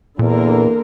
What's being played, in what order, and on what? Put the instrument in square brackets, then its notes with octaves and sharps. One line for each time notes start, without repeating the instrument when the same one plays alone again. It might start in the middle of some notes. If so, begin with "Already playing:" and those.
[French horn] E2 [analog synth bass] A#2 [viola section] D3 A#3 A#4